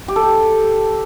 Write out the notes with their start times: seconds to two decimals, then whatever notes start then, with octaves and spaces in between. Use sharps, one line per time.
0.08 G4
0.16 A4
0.23 G4